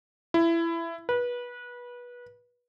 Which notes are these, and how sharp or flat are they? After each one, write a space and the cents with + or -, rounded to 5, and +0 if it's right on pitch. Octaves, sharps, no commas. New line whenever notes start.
E4 +20
B4 -25